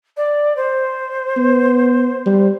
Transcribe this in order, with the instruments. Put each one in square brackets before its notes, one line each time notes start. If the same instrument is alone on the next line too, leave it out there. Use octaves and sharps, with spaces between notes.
[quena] D5
C5
[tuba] B3
G3